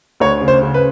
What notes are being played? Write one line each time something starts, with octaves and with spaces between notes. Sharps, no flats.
D2 C#5
C#3
C5
C#3
B4